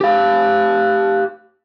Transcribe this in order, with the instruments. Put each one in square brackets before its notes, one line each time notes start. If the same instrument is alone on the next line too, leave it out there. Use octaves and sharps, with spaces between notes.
[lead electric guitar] G4 F5